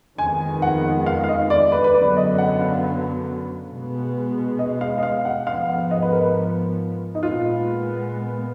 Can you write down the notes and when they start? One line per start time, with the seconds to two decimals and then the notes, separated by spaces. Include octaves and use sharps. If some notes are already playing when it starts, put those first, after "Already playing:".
0.18 F2 D#3 G#3 B3 G#5
0.62 F#5
1.06 F5
1.24 F5
1.28 D#5
1.50 D5
1.72 B4
1.84 B4
1.94 F#2 D3 F#3 B3 D5
2.17 D#5
2.38 F#5
2.61 F5
3.71 B2 G#3 B3
4.59 D#5
4.81 F5
4.98 D#5
5.03 F5
5.25 F#5
5.47 G#2 F3 B3 F5
5.69 F#5
5.91 D#5
6.02 B4
6.13 A#4
7.15 D#4
7.23 A#2 G#3 B3 F4